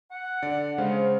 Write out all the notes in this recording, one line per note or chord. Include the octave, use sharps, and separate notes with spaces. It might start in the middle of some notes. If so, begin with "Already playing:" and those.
F#5
D3 D5
C#3 G#3 C5 F5